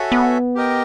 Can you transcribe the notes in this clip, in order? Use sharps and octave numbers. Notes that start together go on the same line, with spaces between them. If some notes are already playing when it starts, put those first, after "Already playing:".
Already playing: F#4 A4 C#5 E5 G#5
B3
G4 A#4 D#5 G5